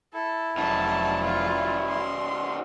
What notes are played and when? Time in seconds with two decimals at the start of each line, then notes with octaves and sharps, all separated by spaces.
0.14 E4 A4
0.57 F1 B2 D#3 F#3 A5
1.24 F4
1.89 C6